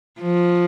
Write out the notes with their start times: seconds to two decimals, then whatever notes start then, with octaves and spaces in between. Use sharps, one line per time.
0.21 F3